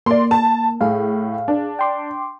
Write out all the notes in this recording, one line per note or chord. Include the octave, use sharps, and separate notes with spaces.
A#3 D5 C6
A5
A2 G#4 F5
D4
G5 C6 D6